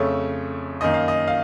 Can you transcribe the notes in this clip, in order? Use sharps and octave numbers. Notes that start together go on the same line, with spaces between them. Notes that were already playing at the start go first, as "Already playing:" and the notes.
Already playing: F2 C#3 A3 C#5
F#2 D#3 A#3 D#5
F5
D#5
F5